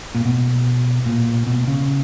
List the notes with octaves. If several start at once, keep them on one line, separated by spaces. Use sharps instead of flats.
A#2
B2
A#2
B2
C#3